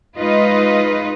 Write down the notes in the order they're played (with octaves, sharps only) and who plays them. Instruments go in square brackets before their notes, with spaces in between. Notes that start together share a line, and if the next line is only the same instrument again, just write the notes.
[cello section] G#3 D#4 F4 B4 D#5